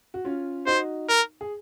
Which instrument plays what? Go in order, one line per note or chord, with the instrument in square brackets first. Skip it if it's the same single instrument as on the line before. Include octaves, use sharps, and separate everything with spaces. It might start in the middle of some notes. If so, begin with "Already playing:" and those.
[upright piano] F#4
C#4 F4
[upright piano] D#4 F#4 [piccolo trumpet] C5
[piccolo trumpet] A#4
[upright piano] G#4